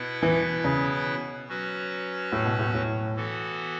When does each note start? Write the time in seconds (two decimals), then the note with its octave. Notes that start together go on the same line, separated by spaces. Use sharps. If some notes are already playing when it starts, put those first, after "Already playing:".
Already playing: B2 B3 E4 B4
0.22 E3
0.64 C#3
1.49 F#3 C#4 F#4 B4
2.32 A2
2.45 B2
2.59 A2
2.74 A2
3.16 E3 B3 F#4 A4